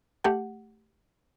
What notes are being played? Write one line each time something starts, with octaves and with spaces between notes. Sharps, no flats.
A3 G4 F#5